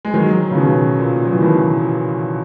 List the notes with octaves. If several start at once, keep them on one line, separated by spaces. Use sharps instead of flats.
G#3
D#3 F#3
C#3
B2 D#3
A#2
F#3
E3
B2 D#3